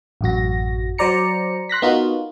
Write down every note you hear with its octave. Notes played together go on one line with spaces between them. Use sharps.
A1 F#2 F#4 A#6
F#3 C5 D5 A#5 C#7
C6 F#6 A#6 B6
B3 D#4 F4 F#4 A#4